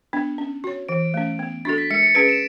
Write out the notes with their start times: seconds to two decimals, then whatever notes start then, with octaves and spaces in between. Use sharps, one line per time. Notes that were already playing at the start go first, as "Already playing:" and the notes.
0.13 B3 D4
0.38 C#4
0.64 F#4 C#5
0.89 E3 D7
1.14 A3 C#4
1.39 B3
1.65 D4 F#4 A4 A6
1.78 B6
1.90 G#3 C#7
2.03 C#7
2.15 C#4 G#4 B4 D7
2.29 E7